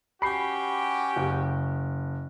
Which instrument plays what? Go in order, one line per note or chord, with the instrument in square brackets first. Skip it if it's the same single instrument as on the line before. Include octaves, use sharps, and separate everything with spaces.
[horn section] C#4 F#4 G4 [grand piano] B5 C7
[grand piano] F#1